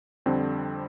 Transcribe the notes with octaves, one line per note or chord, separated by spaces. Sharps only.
F2 D3 G3 C4